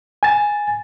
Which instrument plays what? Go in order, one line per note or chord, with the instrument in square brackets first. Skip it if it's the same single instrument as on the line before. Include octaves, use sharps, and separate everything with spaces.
[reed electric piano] G#5 A6